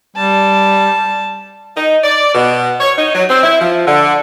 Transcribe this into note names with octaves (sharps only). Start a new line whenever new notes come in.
G3 A5
D#4
D5
B2
C#5
D#4
F#3
C4
E4
F3
D3